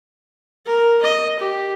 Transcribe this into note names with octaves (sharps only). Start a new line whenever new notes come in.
A#4
D#5
G4